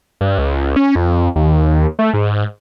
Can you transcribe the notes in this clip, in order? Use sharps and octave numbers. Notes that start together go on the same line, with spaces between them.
G2
C#2
C#4
F2
D#2
A3
G#2